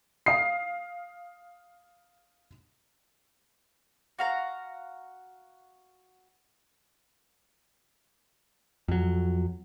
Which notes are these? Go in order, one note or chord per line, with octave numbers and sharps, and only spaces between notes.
F5 D#6 C7
F#4 F5 A#5
F2 F#3